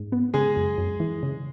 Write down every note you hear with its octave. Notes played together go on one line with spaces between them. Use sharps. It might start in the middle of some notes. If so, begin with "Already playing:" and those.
Already playing: G#2
B3
C#3 G#3 G#4
F#2
F#2
E3
C#3